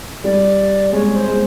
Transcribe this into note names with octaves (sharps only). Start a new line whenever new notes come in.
G3 D5
G#3 C#5
C5
G#3